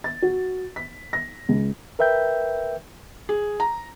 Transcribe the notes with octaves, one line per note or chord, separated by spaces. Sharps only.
A6
F#4
B6
A#6
C#2
A#4 B4 E5 G5 G6
G#4
A#5